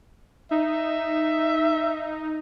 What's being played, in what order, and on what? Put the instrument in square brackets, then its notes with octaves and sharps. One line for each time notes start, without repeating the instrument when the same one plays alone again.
[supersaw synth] D#4 [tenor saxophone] E5